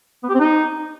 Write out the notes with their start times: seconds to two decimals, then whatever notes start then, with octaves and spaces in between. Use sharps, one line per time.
0.23 B3
0.29 G4
0.35 C4
0.40 D#4